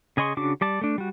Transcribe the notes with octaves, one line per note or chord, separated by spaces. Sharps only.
C#3 G#4 D#5 C6 C#6
C#3 D4 F#4 D6
G3 D5 A5
A3 D4
G3 F#4